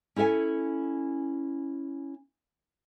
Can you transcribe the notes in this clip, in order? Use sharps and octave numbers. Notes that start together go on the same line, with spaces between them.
C#4 E4 A4 E5 G#5